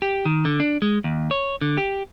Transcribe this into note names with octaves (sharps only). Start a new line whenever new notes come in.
G4
D#3
D3
D4
G#3
D#2
C#5
D3
G4